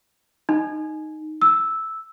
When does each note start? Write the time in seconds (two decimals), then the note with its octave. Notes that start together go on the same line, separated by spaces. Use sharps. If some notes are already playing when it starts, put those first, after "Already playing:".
0.49 D#4
1.42 E6